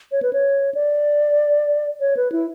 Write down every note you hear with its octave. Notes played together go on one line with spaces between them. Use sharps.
C#5
B4
C#5
D5
C#5
B4
E4